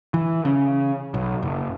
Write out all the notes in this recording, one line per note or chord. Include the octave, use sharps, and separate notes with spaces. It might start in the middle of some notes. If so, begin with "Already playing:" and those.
E3
C#3
B1
F#1